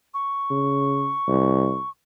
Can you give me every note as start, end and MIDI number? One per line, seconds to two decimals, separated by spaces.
0.14 1.89 85
0.50 1.12 49
1.27 1.76 36